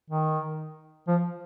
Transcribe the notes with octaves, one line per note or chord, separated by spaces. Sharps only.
D#3
F3